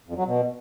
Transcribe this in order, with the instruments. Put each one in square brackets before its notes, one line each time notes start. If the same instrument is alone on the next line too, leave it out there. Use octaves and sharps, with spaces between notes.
[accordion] F2
F#3
B2